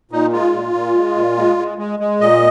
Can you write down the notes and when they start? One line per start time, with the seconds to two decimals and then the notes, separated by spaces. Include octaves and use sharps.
0.11 A#2 D#4
0.32 G#3 F4
0.53 A#2
0.74 A#2
0.94 G#3
1.15 A#2
1.37 G#3
1.57 G#3
1.78 G#3
1.99 G#3
2.20 A#2 D#5